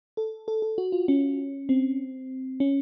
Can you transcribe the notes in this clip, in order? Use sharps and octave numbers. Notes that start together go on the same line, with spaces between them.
A4
A4
A4
F#4
F4
C#4
C4
C#4